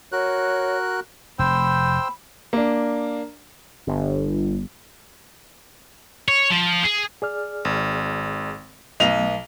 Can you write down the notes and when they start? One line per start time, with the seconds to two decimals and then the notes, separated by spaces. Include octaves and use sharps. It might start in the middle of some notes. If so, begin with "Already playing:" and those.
0.12 F#4 A#4 C#5 F#6
1.39 F1 C5 G5 B5 E6
2.53 A#3 D4
3.87 G1
6.28 C#5
6.50 F3
6.84 G#4
7.22 G#4 D5 F6
7.65 G#1
9.00 B1 F#3 A3 B3 D#5 F7